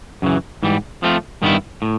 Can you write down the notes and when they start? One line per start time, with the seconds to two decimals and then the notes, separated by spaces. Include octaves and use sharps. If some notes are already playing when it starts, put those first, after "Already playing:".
0.22 F#2 C#3 E3
0.63 G#2 E3 G3
1.03 F3 A3 C4 F4
1.42 G2 D#3 G3 B3 E4
1.82 A2